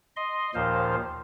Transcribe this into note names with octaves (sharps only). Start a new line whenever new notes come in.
D#5 C6
D#2 A#2 F3 C5 F5